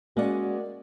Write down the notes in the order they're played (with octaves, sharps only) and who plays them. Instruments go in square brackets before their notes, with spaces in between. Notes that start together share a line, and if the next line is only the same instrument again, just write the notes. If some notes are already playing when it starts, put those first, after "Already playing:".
[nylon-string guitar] G#3 C#4 F#5 [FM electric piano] A#3 D5 [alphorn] F#4